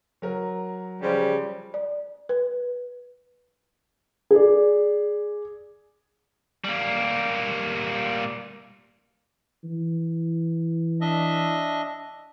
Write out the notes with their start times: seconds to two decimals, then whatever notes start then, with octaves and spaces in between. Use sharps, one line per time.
0.22 F#3 A#4
1.02 C#3 F3 G3
1.74 D5
2.29 B4
4.31 G#4 D5
6.65 G3 A#3
9.64 E3
11.01 D4 D#5 E5